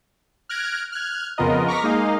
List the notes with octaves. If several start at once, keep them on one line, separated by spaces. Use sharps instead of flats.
F6 F#6 G#6 A#6 D7
F6 F#6 G#6
F2 C#3 B3 F4 A#4 D#5
A#5 C#6 D6 F6 A#6 B6
G#3 A#3 D#4 D#5 F5